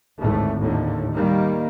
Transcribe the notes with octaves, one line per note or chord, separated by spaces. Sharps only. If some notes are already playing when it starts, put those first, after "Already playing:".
G#1 D2 A2 A3
D#2 A2 D3
D#3 G3 A#3